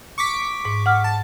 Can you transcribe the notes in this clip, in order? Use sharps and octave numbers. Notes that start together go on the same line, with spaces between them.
C#6 D6 B6
G#2
F#5 F6
A5